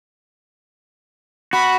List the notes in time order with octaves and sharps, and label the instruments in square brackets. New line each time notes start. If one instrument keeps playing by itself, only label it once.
[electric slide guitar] F#4 [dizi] B5